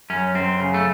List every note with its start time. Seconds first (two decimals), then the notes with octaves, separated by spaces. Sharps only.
0.10 F#2 C#4
0.35 F#2 C4
0.60 C#3
0.74 A3